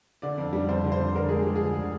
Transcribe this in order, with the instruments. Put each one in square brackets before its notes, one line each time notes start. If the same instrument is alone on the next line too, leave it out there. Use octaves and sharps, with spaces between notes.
[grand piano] D3 D5
F2
G3
F2 C5
D3
C5
F2
D3 A#4
G#3 G#4
F3 G4
G#4
D2
D3